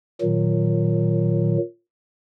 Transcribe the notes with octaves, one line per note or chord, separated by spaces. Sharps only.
A#2 D#3 F#3